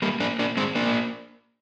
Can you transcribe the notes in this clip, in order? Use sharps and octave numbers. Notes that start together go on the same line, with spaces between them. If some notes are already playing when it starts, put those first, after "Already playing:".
G3 A#3
A#3 D4
A#3 D4
G#3 C4
A#3 D4